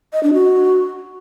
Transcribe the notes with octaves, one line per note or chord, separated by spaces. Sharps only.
D#5
D4
F#4